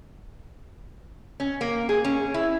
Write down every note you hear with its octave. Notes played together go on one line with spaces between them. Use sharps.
C#4
A#3
G#4
C#4
E4